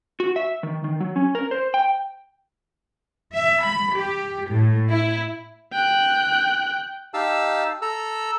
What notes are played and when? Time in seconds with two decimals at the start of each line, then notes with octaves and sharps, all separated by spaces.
0.20 F#4
0.36 E5
0.63 D#3
0.84 D#3
1.00 F#3
1.16 C#4
1.35 A#4
1.51 C5
1.74 G5
3.33 E5
3.64 B5
3.95 G4
4.51 A2
4.90 E4
5.73 G5 F#6
7.14 D#4 G4 F5 A5 E6
7.82 A4 A#5 E6